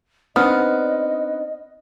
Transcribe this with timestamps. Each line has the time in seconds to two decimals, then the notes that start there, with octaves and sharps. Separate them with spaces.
0.36 B3 C4 D4 D#4 D#5 D#6 F6